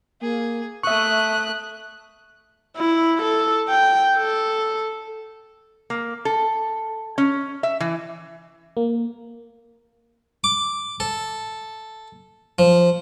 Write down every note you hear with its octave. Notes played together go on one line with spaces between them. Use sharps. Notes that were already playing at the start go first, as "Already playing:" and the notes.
A#3 G#4
A3 E5 C#6 D#6 F#6
E4
A4
G5
A4
A#3
A4
C#4
E5
E3
A#3
D6
A4
F3